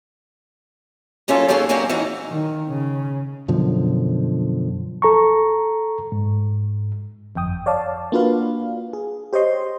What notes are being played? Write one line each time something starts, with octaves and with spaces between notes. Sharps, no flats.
F#3 A#3 C#4 E4 F4 A4
D#3 F#3 A#3 C#4 G#4 A4
F#3 A#3 C#4 D4 F#4 G4
E3 C#4 D#4 F#4
D#3
C#3
F#2 B2 D3 F3
A4 A#5 C#6
G#2
G1 F2 G5 D#6
C#5 D5 F5 A5
A#3 D4 F4 F#4 B4 F5
G#4
G4 C5 C#5 D#5 C6